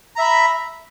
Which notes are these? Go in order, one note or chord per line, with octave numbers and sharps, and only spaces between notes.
E5 A#5 B5